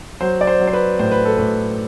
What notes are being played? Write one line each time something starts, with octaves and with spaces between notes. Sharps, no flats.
F#3 C5
D5
C5
F#3
C5
B4
A2 C5
B4
A4
A2 B4